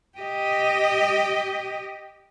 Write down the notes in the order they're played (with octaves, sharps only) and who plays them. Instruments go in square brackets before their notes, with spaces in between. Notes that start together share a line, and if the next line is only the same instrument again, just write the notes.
[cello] G4 D#5